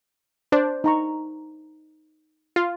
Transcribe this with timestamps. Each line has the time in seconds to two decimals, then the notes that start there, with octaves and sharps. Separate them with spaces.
0.52 D4 C5
0.84 D#4 A#5 C#6
2.56 F4